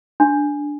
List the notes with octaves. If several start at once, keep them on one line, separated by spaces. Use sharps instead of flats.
D4